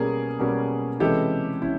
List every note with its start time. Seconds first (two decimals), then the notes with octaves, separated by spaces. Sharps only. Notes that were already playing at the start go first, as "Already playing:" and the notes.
Already playing: B2 G3 A#3 C#4 G#4 A#4
0.39 B2 G3 A#3 C#4
1.00 C3 E3 G#3 C#4 E4 G4 A4
1.62 C#4 E4